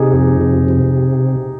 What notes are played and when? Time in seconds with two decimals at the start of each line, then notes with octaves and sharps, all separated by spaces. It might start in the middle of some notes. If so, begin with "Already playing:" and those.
Already playing: C3 D#4 G4 G#4
0.13 F2 G#4
0.41 C3
0.68 C3